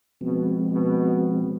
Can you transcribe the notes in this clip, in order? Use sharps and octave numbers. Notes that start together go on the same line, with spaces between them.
B2 F3 G#3 C4
B2